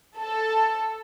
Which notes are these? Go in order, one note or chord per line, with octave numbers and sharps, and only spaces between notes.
A4